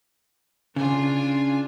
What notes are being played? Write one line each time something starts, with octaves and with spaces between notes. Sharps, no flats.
C#3 D4 F4 G#5